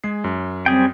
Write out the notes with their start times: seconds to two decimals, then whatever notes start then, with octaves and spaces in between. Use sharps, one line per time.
0.04 G#3 G#4 C7
0.24 F#2
0.66 G3 C4 G#4 G5